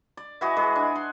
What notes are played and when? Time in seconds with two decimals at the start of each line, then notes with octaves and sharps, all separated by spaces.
0.17 D5
0.41 E3 F#4 G#4 D#5
0.57 E3 G#3 G#4
0.76 D4
0.96 C6